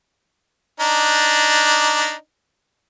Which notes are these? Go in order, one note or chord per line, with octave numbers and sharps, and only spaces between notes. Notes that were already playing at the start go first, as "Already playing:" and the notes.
D4 D#4